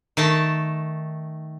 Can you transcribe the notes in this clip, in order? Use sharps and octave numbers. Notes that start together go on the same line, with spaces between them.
D#3 A3 A5